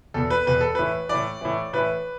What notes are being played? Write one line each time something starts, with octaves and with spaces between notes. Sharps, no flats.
E2 B2 A4
B4
E2 B2 B4
A4
A2 E3 B4
A2 E3 D5
A2 E3
A2 E3 B4